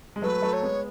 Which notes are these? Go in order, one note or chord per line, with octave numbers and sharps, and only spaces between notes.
G#3
F#3 A3 B4
F#3 A3
C#5
G#3 B3